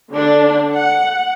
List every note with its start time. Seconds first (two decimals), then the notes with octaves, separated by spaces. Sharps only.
0.12 D3 D4
0.74 F#5